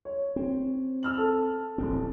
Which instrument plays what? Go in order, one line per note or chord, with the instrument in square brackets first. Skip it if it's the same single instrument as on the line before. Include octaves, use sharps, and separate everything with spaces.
[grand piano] C#5
[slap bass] C4
[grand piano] E6 F6 F#7
A4
[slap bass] D1 A1 C4